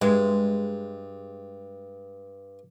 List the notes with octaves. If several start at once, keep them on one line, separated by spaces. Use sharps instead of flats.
G2 G#3